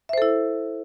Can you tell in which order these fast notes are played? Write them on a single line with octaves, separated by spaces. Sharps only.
E5 C5 A4 E4